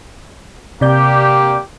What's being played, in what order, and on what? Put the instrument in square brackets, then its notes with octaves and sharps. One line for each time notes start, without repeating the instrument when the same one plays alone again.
[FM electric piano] C3 D5 G6 [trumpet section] A#3 G4